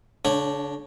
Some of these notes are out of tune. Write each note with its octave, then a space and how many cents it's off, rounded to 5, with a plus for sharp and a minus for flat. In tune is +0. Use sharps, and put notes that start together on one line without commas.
D3 -45 D4 +0 C#5 +0